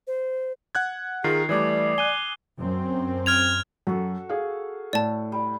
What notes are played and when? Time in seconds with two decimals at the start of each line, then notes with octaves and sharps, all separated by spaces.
0.07 C5
0.75 F#5 F#6 G#6
1.24 D#3 F4 G#4 A#4 C7
1.49 E3 G3 A3 D5 D6 D#6 G#6
1.98 G#5 F#6 D#7 G7
2.60 F#2 C4
3.26 F6 G#6 F7
3.87 F#2 F#4 A4
4.29 G#4 F5
4.93 A2 D5 A5
5.32 G3